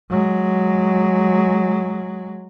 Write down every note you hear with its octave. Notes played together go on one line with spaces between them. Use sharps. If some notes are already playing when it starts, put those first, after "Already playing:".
F#3 G#3